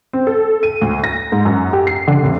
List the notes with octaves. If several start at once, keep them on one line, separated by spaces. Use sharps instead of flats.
C4
A4
D#7
D2
A#6
G#2
F#2
G4
C7
D3
F1